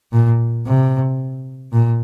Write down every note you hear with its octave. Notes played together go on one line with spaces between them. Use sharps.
A#2
C3
A#2